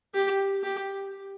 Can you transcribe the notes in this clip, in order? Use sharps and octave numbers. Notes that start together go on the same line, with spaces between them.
G4
G4